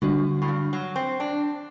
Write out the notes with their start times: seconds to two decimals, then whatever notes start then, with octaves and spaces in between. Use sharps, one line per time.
0.02 F#2 D3 G3 D4 F#4
0.42 A2
0.48 G2
0.73 F#3
0.96 C4
1.20 D4